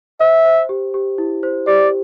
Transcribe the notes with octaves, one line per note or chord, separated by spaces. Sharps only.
C5 E5
C5
G4
G4
E4
C5
G4 D5